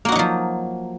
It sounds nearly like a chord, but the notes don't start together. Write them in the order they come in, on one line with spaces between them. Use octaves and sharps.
A#3 F#4 D#4 F#3 F3